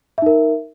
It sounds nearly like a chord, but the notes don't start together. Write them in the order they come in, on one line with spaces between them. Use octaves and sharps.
E5 D#4 A#4